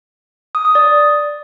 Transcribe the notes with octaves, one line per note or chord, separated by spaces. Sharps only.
D#6
D#6
D5